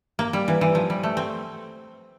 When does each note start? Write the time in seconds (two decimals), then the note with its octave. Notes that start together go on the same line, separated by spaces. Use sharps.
0.19 A#3
0.33 G3
0.48 E3
0.61 E3
0.75 F3
0.90 G3
1.03 A3
1.17 C4